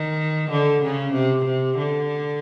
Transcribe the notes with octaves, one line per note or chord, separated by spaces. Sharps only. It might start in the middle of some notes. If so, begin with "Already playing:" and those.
Already playing: D#3
D3
C#3
C3
C3
D3